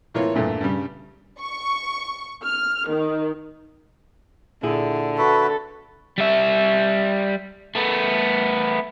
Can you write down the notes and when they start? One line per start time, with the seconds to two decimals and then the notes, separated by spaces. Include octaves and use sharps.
0.14 A2 E3 A#3 F4 C#5
0.34 E2 G2 A#2 A3
0.61 G2 C#3 G3
1.42 C#6
2.44 F6
2.88 D#3
4.63 A#2 D3 E4 G#4
5.18 F#4 A4 B4 E5
6.18 G3 E5
7.75 A3 B3